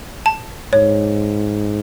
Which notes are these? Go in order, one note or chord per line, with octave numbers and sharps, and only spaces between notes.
A5
G#2 C#5